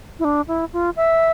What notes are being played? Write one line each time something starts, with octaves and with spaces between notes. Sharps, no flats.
E4
D4
E4
F4
E5